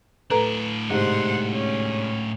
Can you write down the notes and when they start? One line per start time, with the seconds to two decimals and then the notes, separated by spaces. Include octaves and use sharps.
0.30 A2 D4 A4 B4 A#5
0.90 G#2 C3 C5 F#5
1.52 C#4